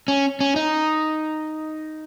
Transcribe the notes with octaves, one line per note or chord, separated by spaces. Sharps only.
C#4
C#4
D#4